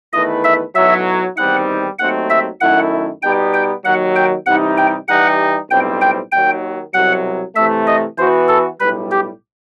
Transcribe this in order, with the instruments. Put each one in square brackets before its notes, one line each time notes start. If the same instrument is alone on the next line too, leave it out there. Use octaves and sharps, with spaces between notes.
[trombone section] E2 D#3 A3 E4 B4 [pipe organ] D#5
[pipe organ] E5
[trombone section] B1 A2 F#3 [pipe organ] E5
[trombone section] E2 D#3 G3 C4 D#4 [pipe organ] F#5
[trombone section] D#2 D#3 F#3 A3 C4 [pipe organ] F#5
[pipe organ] E5
[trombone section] F#2 D#3 A3 E4 [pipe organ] F#5
[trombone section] B2 G3 B3 D#4 G4 [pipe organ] G5
[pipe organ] G5
[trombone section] D#2 D#3 F#3 [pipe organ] F#5
[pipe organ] G5
[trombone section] C3 E3 G3 D#4 [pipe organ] F#5
[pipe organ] G5
[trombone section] E3 G3 D#4 G4 [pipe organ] F#5
[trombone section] B1 A2 G3 C4 [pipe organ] G5
[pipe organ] G5
[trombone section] D#2 D#3 F#3 [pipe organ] G5
[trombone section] C2 B2 F#3 [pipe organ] F#5
[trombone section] C3 E3 A3 [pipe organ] E5
[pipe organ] D#5
[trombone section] E3 B3 F#4 B4 [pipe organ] C5
[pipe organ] A4
[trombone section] B1 A2 G3 [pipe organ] B4
[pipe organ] G4